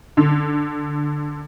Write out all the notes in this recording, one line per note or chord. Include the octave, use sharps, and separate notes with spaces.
D3